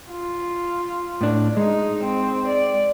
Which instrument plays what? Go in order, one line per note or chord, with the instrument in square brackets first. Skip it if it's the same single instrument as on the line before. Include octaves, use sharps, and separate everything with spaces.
[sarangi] F4
[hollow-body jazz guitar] A2 D4
[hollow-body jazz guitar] G#3 [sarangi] D#4
[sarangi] C4
D5